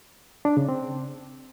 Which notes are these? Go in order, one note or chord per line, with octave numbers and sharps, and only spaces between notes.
D4
C#3
C4